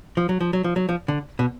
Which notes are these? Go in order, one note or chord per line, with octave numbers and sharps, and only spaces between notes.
F3
F#3
F3
F#3
F3
F#3
F3
D3
B2